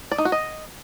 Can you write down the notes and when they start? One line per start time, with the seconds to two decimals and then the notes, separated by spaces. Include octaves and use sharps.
0.11 D5
0.18 D#4
0.25 F#4
0.32 D#5